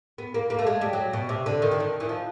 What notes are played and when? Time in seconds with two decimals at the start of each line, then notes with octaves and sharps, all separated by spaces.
0.18 B3
0.34 A#3
0.50 A#3
0.59 A3
0.67 G#3
0.81 G3
0.93 F#3
1.13 B2
1.29 C3
1.46 D3
1.62 D#3
1.71 D3
1.80 D#3
2.00 E3
2.09 F3